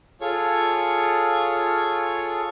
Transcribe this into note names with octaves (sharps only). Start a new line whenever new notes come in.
F4 G#4 A4 C#5 C#6